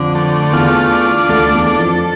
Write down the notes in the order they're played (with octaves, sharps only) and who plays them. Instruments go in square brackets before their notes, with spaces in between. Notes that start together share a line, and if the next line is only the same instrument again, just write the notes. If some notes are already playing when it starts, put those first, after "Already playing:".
Already playing: [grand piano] F2 F3 [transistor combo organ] D3
[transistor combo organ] A3
[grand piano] E2 E3 [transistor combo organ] F4
[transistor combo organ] D4
[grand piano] D2 D3 [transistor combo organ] A4
[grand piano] E2 E3
[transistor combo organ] A4
[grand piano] F2 F3